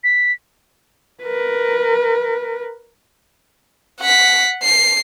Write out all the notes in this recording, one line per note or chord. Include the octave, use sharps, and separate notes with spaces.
B6
A#4 B4
F#5 B6
C7